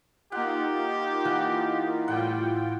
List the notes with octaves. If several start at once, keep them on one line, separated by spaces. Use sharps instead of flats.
A#3 D#4 F4 G4 F#5
E3 F#5
A2 G3 F4 F#5 G5